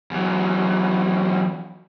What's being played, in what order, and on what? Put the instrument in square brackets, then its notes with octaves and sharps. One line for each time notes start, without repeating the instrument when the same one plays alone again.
[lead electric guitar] E2 F#3